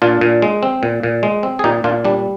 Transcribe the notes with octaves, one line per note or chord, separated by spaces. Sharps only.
A#2 D4 F4
A#2
G#3
C4
A#2
A#2
G#3
C4
G#4
A#2 D#4 G4
A#2 D4 F4
G3 D4